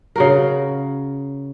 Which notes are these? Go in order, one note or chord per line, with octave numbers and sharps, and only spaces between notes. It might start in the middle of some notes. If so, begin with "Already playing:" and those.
C#3 F#4 A#4